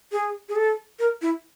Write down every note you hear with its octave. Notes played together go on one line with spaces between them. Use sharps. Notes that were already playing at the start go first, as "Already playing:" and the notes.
G#4
G#4
A4
A#4
E4